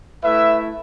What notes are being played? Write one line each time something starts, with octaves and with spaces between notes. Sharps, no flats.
A3 E4 B4 E5